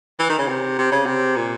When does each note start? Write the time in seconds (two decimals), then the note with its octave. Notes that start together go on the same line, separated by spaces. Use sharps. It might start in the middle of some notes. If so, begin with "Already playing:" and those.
0.20 E3
0.29 D#3
0.39 C#3
0.48 C3
0.78 C3
0.92 C#3
1.06 C3
1.36 A#2